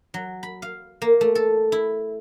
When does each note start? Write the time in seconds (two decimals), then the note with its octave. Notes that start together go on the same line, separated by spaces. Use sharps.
0.14 F#3
0.43 B5
0.62 F5
1.02 A#3
1.21 A3
1.35 A4
1.72 E4